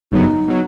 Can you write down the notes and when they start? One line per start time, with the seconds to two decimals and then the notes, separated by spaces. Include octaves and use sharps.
0.12 G1 F#2 C#3 F#3 B3 D#4
0.48 B2 F#3